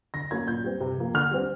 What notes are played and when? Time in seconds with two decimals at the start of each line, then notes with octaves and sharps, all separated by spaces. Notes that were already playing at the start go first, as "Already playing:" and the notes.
0.14 D3 A#6
0.31 F#3 A#3 C#4 G#6
0.47 A#2 G6
0.64 G3 C4
0.81 C3
0.98 F3 A#3
1.14 D3 F6
1.31 G3 C4